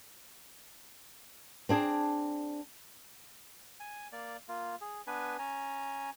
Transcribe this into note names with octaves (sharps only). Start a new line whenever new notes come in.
C4 D4 G#4
G#5
A#3 D5
A#3 F4
G#4
B3 D4 B4 G#5
C#4 G#5 A#5